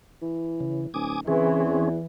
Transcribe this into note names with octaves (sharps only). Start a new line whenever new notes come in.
E3
C#3
D1 G#5 D6 D#6
C#3 E3 C4 C#4 G#4
E2